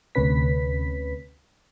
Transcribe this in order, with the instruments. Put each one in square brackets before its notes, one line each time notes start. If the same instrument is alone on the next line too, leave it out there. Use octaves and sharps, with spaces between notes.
[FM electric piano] D2 C3 C#4 B4 B6